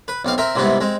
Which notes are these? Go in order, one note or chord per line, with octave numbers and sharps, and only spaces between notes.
B4
B1 C4 F5
C4 A#4 E5
C2 G#2 C3 B3 E4
G#3 C4